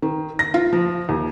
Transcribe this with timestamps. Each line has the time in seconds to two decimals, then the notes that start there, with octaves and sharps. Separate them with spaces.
0.02 D#3
0.39 A#6
0.54 F4
0.73 F3
1.09 D#2